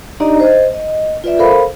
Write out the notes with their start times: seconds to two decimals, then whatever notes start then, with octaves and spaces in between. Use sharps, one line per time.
0.20 D4 D#4 G4 D5 D#5 A#5
0.40 C5 D#5
0.74 D#5
1.24 F4 B4 D5 E5
1.39 A4 A#4 C5 F5 B5